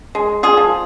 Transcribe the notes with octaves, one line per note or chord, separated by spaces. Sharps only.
G#3
F4 G#4
F3